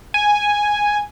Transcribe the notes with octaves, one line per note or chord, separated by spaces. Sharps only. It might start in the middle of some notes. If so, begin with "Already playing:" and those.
G#5